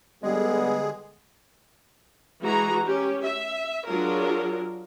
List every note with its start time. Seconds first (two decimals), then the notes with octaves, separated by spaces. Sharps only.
0.23 D3 G3 G#3 B3 G#4
2.42 E3 G#3 F#4 G#4 A#5
2.85 C#4 G4
3.25 E5
3.85 F#3 D4 F4 G#4 A#4